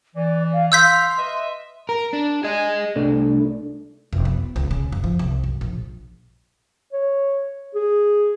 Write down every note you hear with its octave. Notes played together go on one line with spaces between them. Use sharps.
E3 D5
F5
F5 C6 E6 G6 B6
B4 D#5 E5
A#4
D4
G#4 D#5 G#5
C2 A3 D4
F1
B3
C#2
C#3
F#1
F3
C2
F#2
A#1
C#5
G#4